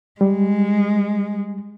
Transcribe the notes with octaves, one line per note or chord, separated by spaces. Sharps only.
G3 G#3